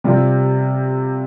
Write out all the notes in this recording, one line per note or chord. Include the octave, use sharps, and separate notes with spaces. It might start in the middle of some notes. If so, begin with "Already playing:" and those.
C3 G3 C4 F4